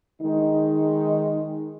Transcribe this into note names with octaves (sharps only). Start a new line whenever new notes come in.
D#3 G#3 D#4